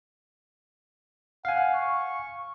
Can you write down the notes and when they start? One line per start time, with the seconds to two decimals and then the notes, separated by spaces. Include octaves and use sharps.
1.45 F5 F#5 G#5
1.75 C#6